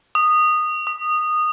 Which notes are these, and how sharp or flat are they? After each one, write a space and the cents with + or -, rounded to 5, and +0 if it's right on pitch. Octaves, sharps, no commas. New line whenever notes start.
D#6 -15
D#6 -20